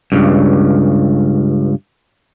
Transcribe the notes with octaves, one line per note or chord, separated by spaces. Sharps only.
C#2 G2